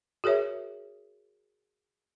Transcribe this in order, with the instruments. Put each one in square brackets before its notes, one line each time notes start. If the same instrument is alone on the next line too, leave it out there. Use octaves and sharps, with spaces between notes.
[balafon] F#4 G#4 A#4 C#5 E5